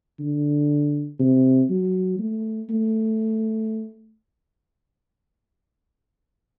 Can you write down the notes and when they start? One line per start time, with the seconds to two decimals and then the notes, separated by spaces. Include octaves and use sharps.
0.19 D3
1.20 C3
1.70 F#3
2.19 A3
2.69 A3